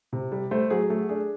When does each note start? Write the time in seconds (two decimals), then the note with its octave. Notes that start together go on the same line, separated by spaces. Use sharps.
0.12 C3
0.32 G3
0.51 A3 C5
0.70 F#3 G#4
0.90 A3 G#4
1.09 D4 G#4